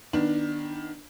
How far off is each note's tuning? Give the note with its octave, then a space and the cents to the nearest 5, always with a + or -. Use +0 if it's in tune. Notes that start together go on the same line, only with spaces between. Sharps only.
D#3 +0 B3 -10 D4 +10